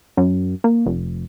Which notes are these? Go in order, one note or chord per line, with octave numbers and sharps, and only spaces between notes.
F#2
A#3
F1